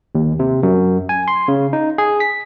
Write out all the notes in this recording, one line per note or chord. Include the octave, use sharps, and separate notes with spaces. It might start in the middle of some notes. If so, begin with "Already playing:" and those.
D#2
C3
F#2
G#5
C6
C#3
D#4
G#4
B6